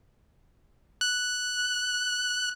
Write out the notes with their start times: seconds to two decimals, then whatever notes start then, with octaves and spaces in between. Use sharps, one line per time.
1.01 F#6